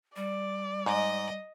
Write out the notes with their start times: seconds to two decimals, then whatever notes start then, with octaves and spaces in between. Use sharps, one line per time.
0.16 G3 D5
0.86 G#2 D#5